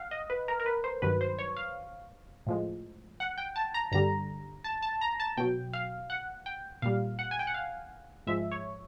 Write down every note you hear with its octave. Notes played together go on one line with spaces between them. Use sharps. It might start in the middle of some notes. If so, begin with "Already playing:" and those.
Already playing: F5 F#5
D#5
B4
A#4
A#4
B4
C5
G2 D#3 F#3 B4
C5
C#5
F5
A2 F3 G#3
F#5
G5
A5
A#5
G2 D3 G3 A#5
A5
A5
A#5
A5
B2 F#3 G5
F5
F#5
G5
A#2 G3 F5
F#5
G#5
G5
F#5
F5
G#2 F3 G#3 E5
C#5